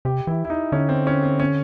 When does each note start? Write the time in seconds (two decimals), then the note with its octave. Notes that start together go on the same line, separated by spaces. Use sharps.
0.05 C3 G4
0.27 E3 E4
0.45 E4
0.50 D#4
0.72 D3 C#4
0.89 C4
1.07 C#4
1.23 C4
1.40 C#4